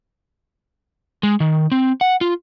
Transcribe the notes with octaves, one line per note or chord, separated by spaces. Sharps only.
G#3
D#3
C4
F#5
F4